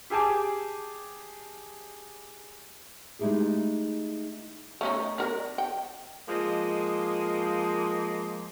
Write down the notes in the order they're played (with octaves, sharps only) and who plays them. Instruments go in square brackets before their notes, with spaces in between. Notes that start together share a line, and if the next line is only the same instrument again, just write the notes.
[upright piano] G4 G#4 G#5 A5 D6
[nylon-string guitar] G#3 A3 D#4 E4 G4 G#4
[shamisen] A3 C#4 D#4
D4 A#4
G5
[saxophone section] F3 G#3 A#3 D#5